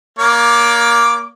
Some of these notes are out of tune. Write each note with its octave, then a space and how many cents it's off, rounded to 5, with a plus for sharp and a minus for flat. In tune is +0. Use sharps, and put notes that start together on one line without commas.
A#3 +15 C#5 +45 D6 +0